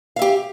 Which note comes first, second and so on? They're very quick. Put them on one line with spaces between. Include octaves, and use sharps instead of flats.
F5 E5 G4